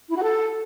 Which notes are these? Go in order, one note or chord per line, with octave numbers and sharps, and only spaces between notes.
E4
F#4
A4